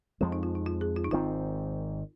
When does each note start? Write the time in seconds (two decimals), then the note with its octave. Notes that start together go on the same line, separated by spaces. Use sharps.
0.20 F2 F3 G#3 C4 F4
0.32 D#4
0.43 F4
0.55 D#4
0.66 F4
0.81 G#4
0.96 F4
1.05 D#4
1.11 G#1 G#2 D#3 C4 F4